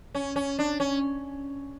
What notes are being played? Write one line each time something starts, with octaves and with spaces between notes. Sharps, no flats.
C#4
C#4
D4
C#4